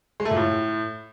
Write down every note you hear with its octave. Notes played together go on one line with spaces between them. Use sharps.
G#3
A3
A#2
A2